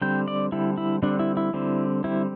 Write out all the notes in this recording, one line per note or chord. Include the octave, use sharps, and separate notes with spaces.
D3 G3 C4 G5
D5
D3 G3 C4 E4
E4
D3 G3 C4 D4
E4
E4
D3 G3 C4
D3 G3 C4 E4